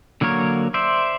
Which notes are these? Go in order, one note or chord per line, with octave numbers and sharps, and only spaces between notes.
D3 F#3 A#3 A#4 C#5
C5 D5 E5